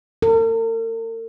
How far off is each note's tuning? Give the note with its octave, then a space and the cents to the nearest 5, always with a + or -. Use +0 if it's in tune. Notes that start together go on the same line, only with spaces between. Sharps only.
A#4 -45